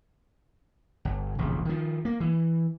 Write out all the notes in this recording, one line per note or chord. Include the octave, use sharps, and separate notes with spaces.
G1
E1 A#1 C#3
D#3 F3
A#3
E3